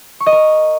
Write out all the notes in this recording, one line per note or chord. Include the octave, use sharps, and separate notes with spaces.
C#6
D#5
A#4